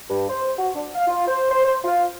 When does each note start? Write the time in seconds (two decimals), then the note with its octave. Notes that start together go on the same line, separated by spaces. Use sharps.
0.10 G2
0.29 C5
0.59 F#4
0.75 D4
0.95 F5
1.07 F4
1.28 C5
1.51 C5
1.65 C5
1.84 F4